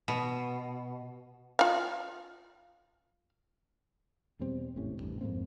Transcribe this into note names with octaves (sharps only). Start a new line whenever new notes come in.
B2
F4 F5
E2 B2 G3 C4
G#1 A2 C3 C#4
A1 E2 G2 B2
F2 G#2 A#3 C4